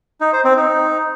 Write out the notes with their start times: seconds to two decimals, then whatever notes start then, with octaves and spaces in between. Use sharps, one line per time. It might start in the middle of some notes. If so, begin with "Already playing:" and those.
0.21 D#4
0.33 C5
0.45 C4
0.57 D#4